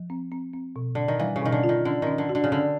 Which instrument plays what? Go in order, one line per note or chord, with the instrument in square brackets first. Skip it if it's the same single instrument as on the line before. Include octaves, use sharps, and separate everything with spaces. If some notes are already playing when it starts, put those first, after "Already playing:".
Already playing: [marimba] F3
C4
C4
C4
B2
[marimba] B2 [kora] D3
[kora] D#3
[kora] E3 [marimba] G3
[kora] C#3
[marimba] B2 [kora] D#3
[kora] D3
[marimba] F4
[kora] D#3
[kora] D3 [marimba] C#4
[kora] D#3 [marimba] C#4
[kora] D3
[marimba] F#4
[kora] D3
C#3
[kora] D3 [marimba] C#4